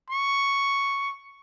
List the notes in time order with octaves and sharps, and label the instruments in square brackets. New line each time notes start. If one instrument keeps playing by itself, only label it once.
[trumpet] C#6